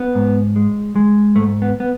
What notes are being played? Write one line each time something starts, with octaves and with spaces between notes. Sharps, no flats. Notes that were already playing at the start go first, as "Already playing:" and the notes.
Already playing: B3
G#2
G#3
G#3
G#2 A3
B3
B3